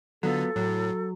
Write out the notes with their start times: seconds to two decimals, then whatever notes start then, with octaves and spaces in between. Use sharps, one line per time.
0.23 D3 F#3 B3 F4 A4
0.56 A2 F#3